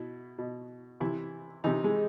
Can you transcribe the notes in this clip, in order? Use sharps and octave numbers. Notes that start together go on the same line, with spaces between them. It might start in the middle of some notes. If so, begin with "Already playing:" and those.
Already playing: B2 E4
B2
C3 E3 E4
C3 E3 D#4
G#3